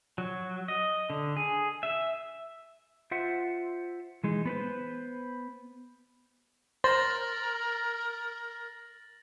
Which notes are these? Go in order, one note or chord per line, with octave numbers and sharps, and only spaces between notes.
F#3
D#5
D3
G#4
E5
F4 C5 E5 F#5
E3 G#3 D#4
B3 B4 C5
A#4 C5 A6 A#6 F#7